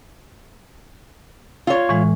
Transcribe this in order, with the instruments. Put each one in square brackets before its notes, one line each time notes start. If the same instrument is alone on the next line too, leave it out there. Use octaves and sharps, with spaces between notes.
[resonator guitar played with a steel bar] F4 C#5
[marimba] A2 E3 G#3